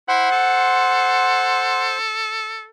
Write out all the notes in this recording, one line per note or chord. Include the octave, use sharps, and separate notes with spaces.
E4 C5 F#5 C6
A4